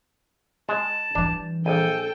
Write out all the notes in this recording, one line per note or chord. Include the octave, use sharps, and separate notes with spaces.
G#3 A5
E3 G3 D4
A#1 A4 G5 G#5